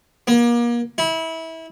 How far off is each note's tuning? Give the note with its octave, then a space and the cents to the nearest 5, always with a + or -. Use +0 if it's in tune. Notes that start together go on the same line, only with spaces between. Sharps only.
A#3 +35
E4 -25